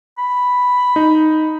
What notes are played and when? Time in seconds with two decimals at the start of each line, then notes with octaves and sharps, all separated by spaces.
0.18 B5
0.96 D#4